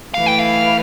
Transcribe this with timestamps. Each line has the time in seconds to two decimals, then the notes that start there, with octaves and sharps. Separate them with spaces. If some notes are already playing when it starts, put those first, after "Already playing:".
0.14 E3 A3 E4 B4 F5
0.26 G5
0.39 F5